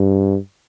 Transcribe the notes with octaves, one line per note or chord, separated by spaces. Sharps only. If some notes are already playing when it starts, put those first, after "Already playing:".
Already playing: G2